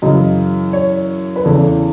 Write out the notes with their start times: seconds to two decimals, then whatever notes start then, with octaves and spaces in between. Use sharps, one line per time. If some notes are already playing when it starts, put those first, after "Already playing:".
0.02 F#2 C#3 E3 D#5
0.73 C#5
1.36 B4
1.44 E2 C#3 E3 A4